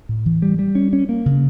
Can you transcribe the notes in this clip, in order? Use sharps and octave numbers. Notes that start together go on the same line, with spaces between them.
A2
E3
G3
G3
C#4
C#4
A#3
C#3